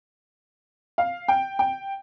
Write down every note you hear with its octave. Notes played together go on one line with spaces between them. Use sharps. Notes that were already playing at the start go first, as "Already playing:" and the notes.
F5
G5
G5